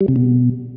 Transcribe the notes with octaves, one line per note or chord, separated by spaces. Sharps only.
G3
C3
B2